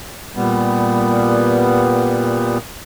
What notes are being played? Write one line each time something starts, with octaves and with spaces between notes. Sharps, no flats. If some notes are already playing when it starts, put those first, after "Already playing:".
A#2 G3 B3